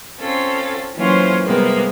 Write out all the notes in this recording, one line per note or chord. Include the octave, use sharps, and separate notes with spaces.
C4 C#4 F4 A4
E3 F#3 A#3 C#4 F4 C5
C3 G3 G#3 A#3 B3